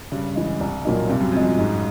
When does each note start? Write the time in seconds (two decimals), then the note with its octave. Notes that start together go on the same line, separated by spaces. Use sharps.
0.12 G2 C#3
0.36 E3 G#3
0.61 C2
0.85 A#2 F#3 A#3 D#4
1.09 G2 C3
1.20 F#2
1.32 F2 F3 G#3
1.43 F#2
1.58 G#2